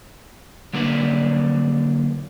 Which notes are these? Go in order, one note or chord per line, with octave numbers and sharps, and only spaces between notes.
D3 F#3 A#3 D4 B4 D5